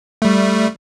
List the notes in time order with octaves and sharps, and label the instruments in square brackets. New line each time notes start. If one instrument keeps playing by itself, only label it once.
[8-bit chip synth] G3 A3